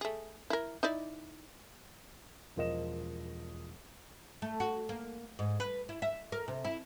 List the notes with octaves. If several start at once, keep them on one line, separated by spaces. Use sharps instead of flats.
A3 G#4
E4 A#4
D#4 E4 D5
E1 F3 A#4 D#5 E7
A3
F#4
A#3
G#2
B4
E4
E5
A#4
C3
E4